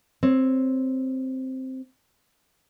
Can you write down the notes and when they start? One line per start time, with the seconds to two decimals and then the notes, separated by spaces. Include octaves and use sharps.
0.23 C4 C#5